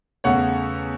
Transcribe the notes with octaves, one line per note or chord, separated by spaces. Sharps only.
E2 C#3 A3 C#5 F#5